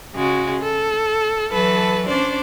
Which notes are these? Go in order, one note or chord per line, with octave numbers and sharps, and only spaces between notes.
C#3 G#3 F#4
A4
E3 F#3 A4 B4 A5
C#4 D4 C5 D5